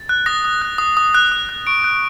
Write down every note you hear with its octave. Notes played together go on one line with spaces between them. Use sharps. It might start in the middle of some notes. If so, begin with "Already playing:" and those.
Already playing: A6
F#6
D#6 A#6
D#6
F#6
D#6
D#6
F#6
D#6
F#6
C#6 D7
F#6